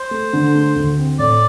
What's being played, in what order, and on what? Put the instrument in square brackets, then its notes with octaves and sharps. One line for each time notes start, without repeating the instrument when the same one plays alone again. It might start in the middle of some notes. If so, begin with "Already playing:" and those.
Already playing: [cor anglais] C5
[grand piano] A3
D3
A3
D2
C4
[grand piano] A2 [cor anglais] D5